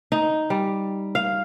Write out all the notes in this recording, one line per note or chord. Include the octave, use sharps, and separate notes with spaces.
D#4
G3
F5